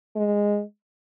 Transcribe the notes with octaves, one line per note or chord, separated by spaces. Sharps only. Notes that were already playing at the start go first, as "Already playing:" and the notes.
G#3